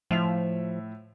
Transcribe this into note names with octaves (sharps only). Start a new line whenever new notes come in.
A2 F3 E5 F7